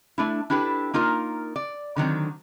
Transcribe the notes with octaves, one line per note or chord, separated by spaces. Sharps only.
A3 D4 E4
D4 E4 G4 A4 B4
A#3 D#4 F4 A#4
D5
D3 D#3 F#3 C4